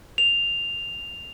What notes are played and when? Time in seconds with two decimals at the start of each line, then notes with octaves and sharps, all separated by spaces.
0.18 F7